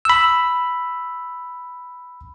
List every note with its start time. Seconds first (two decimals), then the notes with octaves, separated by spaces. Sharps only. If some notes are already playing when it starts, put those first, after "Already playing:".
0.05 B5 E6